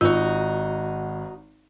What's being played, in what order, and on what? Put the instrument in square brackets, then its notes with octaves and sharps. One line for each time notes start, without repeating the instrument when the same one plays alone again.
[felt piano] G#1 [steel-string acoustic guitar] D#4 F#4 [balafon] F4